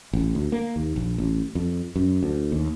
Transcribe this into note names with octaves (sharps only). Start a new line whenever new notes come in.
A1
D2
A#3
D#2
A#1
A1
F2
F#2
D2
D#2